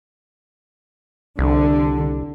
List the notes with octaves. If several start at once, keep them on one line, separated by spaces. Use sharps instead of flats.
C2 D3